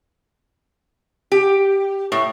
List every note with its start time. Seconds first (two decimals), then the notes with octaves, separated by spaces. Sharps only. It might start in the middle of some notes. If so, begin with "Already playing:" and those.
1.32 G4
2.12 A2